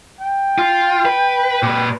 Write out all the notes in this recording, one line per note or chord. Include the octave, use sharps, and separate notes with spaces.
G5
F4
B4
A#2 B4